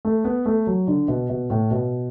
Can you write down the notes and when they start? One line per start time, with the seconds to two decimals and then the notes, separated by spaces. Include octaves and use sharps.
0.05 A3
0.25 B3
0.46 A3
0.67 F#3
0.87 D3
1.08 B2
1.29 B2
1.50 A2
1.71 B2